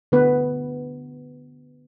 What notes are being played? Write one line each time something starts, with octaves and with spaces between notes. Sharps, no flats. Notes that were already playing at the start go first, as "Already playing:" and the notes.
D3 B3 B4